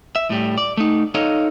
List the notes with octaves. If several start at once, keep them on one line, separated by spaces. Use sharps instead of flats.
E5
A2 G3
D5
A3 D#4
D#4 A4 C#5 D#5 F5